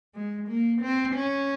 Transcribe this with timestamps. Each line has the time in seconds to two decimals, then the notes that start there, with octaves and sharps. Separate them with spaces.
0.15 G#3
0.48 A#3
0.82 C4
1.15 C#4